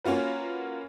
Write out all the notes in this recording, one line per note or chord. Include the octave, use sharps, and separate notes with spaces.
A#3 C#4 F4 F#4 B4